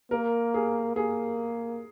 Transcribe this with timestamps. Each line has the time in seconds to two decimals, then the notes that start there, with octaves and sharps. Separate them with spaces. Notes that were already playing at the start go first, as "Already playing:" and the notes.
0.11 A#3 A#4
0.54 G#4
0.96 A#3 G#4